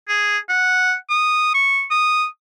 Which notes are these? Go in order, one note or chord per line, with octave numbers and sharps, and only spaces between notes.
G#4
F#5
D#6
C#6
D#6